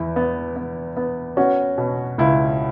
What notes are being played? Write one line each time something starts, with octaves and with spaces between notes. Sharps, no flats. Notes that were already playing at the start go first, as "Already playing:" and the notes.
Already playing: E2 E4
B3
B3
B3
B3 C#4 F#4
B2
C#2 E4